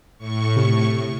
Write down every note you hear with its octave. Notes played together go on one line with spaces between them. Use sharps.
A2 C#6
C3